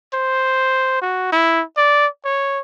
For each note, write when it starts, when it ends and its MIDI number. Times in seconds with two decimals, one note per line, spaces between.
0.13 0.98 72
1.02 1.29 66
1.32 1.63 64
1.77 2.07 74
2.25 2.61 73